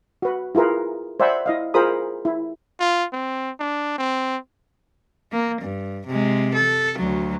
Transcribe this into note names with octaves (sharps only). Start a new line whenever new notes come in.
F#4 B4
E4 F4 G#4 A#4 B4
C5 D5 E5 F#5 G#5 B5
E4 D#5 F5
F4 G#4 A#4 C5 B5 D#6
E4
F4
C4
D4
C4
A#3
G2
C3 G#3
A4
D2 F#3